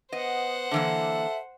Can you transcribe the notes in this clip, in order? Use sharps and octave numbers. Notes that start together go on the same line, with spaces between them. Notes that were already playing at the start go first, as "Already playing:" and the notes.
B3 C5 D#5 F#5
D3 E3 A#3 A4 E5